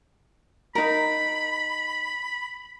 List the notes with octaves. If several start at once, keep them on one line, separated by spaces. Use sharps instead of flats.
D#4 A#4 B5